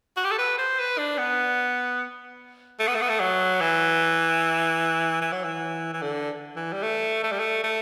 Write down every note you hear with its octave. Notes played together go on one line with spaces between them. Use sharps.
F#4
G4
A4
B4
C5
B4
D4
B3
A3
B3
A3
B3
A3
F#3
E3
E3
F#3
E3
E3
D3
E3
G3
A3
A3
G3
A3
A3